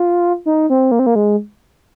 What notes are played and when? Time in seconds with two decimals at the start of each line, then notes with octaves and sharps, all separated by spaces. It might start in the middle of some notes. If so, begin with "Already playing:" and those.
Already playing: F4
0.46 D#4
0.70 C4
0.92 A#3
0.99 C4
1.07 A#3
1.16 G#3